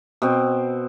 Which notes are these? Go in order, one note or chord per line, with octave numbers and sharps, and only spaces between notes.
B2 C4